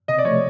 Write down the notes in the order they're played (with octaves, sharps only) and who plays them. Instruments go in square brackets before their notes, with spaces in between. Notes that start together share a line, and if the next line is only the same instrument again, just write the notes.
[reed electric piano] C3 [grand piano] D#5
[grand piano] D5
[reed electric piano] F3 [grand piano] C#5
[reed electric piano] A3